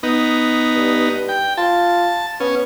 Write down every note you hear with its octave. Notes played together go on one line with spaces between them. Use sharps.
B3 D#4
G2
G5
F4 A5
B3 C#4